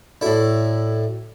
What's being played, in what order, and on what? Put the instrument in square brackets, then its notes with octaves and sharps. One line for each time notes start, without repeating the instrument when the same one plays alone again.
[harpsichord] A2 E4 [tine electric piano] F#4 A4 D5